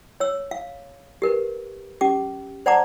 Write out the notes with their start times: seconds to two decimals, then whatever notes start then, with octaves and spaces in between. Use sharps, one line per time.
0.20 C#5 E6
0.51 F5
1.22 G4 A#4 B4
2.01 C#4 G4 D6
2.66 C5 D5 F#5 A5 A#5 D6